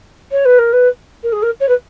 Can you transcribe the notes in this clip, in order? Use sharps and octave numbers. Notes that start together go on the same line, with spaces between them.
C#5
B4
A#4
B4
A#4
G#4
A#4
C#5
B4